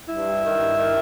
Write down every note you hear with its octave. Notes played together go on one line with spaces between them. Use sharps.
G2 E4
G3
D#3
G2
D#3